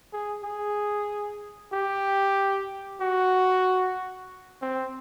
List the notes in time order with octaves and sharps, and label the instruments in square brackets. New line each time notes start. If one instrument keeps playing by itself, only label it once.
[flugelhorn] G#4
G#4
G4
F#4
C4